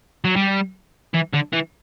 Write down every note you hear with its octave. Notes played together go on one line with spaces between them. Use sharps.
F#3
G3
E3
D3
E3